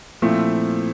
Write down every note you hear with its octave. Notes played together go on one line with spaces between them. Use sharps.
A#2 F3 A3 C4 E4